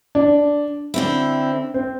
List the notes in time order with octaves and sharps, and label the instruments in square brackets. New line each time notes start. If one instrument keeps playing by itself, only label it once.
[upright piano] D4
[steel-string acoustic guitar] D3 C4 E4
[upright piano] C4